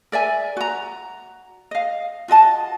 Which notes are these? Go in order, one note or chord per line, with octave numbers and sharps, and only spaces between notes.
A#4 D5 E5 G#5
F#4 A#5
D#5 F5
F4 F#4 D#5 A5